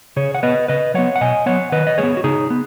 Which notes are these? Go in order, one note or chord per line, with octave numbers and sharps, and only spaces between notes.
C#3 G#4 C#5
F#5
B3 B4 D#5
C#3 B4 D#5
F#3 B3 C#5 F#5
F#5
B2 D#5 G#5
F#3 B3 C#5 F#5
D#3 B4 D#5
D#5
G#3 G#4 C#5
B3
F#4
C#3 D#4 G#4
B3